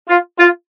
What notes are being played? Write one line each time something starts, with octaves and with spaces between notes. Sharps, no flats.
F4
F4